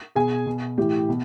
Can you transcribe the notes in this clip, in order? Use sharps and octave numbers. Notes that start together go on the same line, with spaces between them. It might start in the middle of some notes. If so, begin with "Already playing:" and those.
B2 G#4 G#5
B2
A2 E3 G4 G5
B2